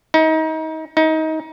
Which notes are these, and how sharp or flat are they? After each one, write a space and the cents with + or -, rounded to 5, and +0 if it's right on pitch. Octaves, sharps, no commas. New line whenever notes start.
D#4 +30
D#4 +25